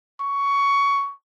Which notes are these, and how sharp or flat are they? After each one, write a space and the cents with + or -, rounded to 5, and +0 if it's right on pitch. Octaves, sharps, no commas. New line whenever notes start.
C#6 +15